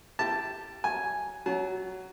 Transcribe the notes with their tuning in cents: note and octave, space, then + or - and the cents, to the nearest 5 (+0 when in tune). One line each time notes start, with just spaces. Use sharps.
E4 +35 G4 +0 A5 +0
F#3 +30 G#5 +0
F#3 +15 A5 -40